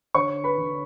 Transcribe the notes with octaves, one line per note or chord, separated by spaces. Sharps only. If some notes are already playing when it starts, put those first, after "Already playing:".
D3 C#5 C#6
B4 B5
D3